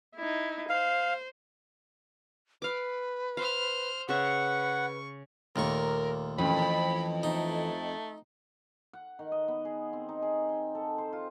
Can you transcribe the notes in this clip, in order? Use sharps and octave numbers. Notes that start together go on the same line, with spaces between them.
D#4 E4
C5 F5
B4 F5 D6
C5 F5 F6
C#3 B4 E5 F#5 C#6
D#2 A#2 A3 D#4 A#4 C#6
F2 E3 C#4 B5
A3 D#4
F#5
D#3
D#5
B3
G#4
C4
D#4
G#4
G5
A4
C5
F4